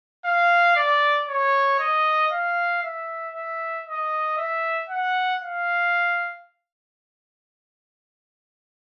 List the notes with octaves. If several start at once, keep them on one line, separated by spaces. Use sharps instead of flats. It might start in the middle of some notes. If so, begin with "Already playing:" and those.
F5
D5
C#5
D#5
F5
E5
E5
D#5
E5
F#5
F5